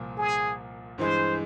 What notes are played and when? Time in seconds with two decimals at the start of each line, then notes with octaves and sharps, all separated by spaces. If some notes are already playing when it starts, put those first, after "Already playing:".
Already playing: C2 A#2 F3
0.17 G#4
0.98 G2 E3 G#3 C5